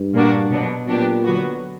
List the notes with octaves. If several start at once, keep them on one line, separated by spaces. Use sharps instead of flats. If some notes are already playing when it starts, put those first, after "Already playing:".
Already playing: G2
A#2 A#3 D4 F#4
B2 F#3 B3 D4
A#2 F#3 B3 D4 G4
D3 F#3 B3 F#4